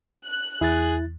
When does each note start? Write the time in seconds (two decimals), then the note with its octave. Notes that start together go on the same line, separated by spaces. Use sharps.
0.24 F#6
0.61 E2 E4 G#4 A6